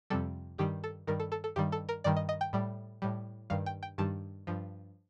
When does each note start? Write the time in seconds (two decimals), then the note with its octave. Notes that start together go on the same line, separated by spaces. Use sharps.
0.10 F2 C3 G3 A4
0.58 G2 D#3 G3 G4
0.84 A4
1.07 G2 D#3 G3 A#4
1.20 A4
1.32 A4
1.44 A4
1.56 G2 D#3 G3 G4
1.72 A4
1.89 A#4
2.04 G2 D#3 G3 D5
2.17 D#5
2.29 D#5
2.41 G5
2.53 A2 G3
3.02 A2 G3
3.50 G2 D#3 G3 F5
3.66 G5
3.83 G5
3.98 G2 D#3 G3 A5
4.47 G2 F3